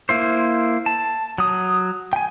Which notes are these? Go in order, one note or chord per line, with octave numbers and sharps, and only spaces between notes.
A#3 E4 C5
A5
F#3 D#6
G5 G#5